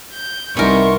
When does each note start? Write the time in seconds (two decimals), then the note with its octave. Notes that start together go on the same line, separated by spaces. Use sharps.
0.13 G6
0.57 C2 B3 D#4 E4 G#4 A#4 C6 C#6